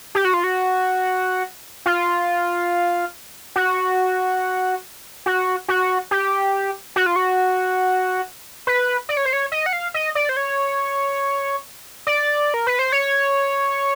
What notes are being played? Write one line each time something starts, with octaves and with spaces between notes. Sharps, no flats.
G4
F#4
F4
F#4
F4
F#4
F#4
F#4
G4
F#4
F4
F#4
B4
D5
C#5
C5
C#5
D#5
F#5
F5
D#5
D5
C5
C#5
D5
A#4
B4
C5
C#5